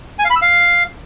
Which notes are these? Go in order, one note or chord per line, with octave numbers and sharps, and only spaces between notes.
G#5
F5
B5
E6
F5